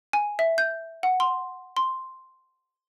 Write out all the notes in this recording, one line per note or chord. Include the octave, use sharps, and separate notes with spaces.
G#5
E5
G6
F#5
C6
C6